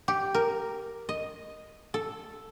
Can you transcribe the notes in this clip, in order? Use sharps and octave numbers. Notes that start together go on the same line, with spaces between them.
G4
A#4
D#5
A4